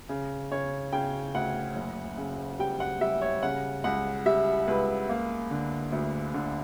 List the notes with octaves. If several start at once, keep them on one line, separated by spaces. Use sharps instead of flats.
C#3
C#3 C#5
C#3 G5
D2 F#5
F#1
C#3
G3 G5
F#5
G3 E5
C#5
C#3 F#5
C#2 F#5
G3 E5
C#2 B4
A#3
D3
D2
D3